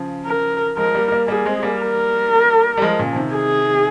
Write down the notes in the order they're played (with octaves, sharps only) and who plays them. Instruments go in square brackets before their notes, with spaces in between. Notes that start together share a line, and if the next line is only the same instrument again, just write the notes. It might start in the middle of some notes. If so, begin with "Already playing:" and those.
Already playing: [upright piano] C#3 F3
[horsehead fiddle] A#4
[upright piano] F3 G#3 [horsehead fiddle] A#4
[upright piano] G3 A#3
G3 A#3
[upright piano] G3 A#3 [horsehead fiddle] G#4
[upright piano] G#3 C4
G3 A#3
[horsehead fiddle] A#4
[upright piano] G3
F3 G#3
A#2 C#3
F3
C3 D#3
[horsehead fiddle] G#4